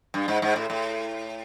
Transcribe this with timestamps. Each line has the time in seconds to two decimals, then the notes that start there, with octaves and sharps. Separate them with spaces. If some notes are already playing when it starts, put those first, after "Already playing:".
0.14 G2
0.28 G#2
0.42 G#2
0.56 A2
0.70 A2